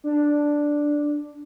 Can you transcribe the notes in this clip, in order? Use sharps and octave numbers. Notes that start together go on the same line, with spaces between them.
D4